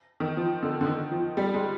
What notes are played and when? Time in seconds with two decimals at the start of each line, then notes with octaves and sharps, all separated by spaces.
0.20 D#3
0.37 F3
0.63 D3
0.81 D3
0.87 D#3
1.12 F3
1.37 G3
1.54 G#3